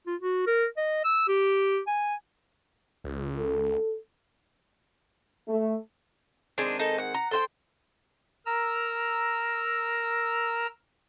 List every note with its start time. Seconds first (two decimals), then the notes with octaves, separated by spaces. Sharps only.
0.07 F4
0.22 F#4
0.47 A#4
0.78 D#5
1.05 E6
1.28 G4
1.87 G#5
3.04 C#2
3.38 A4
5.48 A3
6.58 D#3 G#3 C4 D4 G#5
6.79 D#4 A4
6.98 F#5
7.14 A#5
7.31 A4 C5 G5
8.46 A#4 A#5 E6